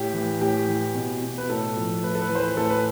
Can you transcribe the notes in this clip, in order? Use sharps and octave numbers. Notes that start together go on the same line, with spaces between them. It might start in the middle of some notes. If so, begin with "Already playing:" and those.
Already playing: A2 G4
E3
A2 G4
E3
B2
B2
B4
A2 A4
F3
A2 B4
A4
B4
E3
C5
B4
A2 A4
B4